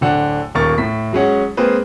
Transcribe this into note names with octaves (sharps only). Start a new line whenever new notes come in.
D1 D3 F#5
D#1 D#2 A#4 C#6 A6
A2 B6
F#3 G#3 C#4 F#5
G#3 A#3 C4 G#4 B4